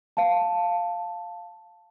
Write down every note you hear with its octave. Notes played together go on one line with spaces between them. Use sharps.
F5 A5